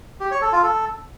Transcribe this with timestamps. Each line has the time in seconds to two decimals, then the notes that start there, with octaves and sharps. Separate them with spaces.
0.20 G4
0.31 C#5
0.42 A4
0.52 F4
0.63 A4